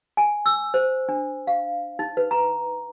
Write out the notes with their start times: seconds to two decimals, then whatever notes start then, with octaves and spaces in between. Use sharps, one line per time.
0.17 G#5
0.46 E6
0.74 C5
1.09 D4
1.47 F5
1.99 D#4
2.17 B4
2.31 A#5